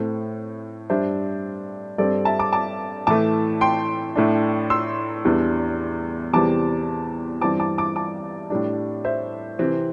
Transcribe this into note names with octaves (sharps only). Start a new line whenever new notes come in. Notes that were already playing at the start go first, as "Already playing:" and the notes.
Already playing: A2 A3 C4
G2 G3 D4 C5 E5
G2 G3 C4 A4 D5
E5 A5
A5 D6
A5 D6
A2 E3 A3 A5 D6
G5 C6
A2 A3 D4
C6 E6
E2 E3 G3 D4
E2 C3 E3 G3 C4 A5 D6
G2 E3 C4 A5 D6
A5 D6
A5 D6
A5 D6
A2 G3 D4
C5 E5
C3 E3 C4